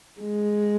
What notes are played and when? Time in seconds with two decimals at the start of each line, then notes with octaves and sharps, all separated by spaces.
0.21 G#3